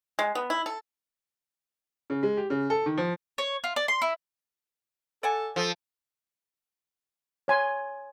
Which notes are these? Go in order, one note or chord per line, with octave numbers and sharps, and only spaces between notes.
G#3
B3
E4
A4
C#3
G#3
G4
C#3
A4
D#3
F3
C#5
F4
D5
C6
E4
A4 D5 F#5 G#5
F3 A4
C#5 G#5 C6